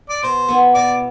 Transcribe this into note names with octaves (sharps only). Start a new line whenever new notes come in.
D5
B2 C5
B3 E4
B2 D5